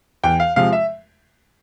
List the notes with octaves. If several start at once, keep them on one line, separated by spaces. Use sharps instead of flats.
E2 G5
F5
C3 F3 G#3 F5
E5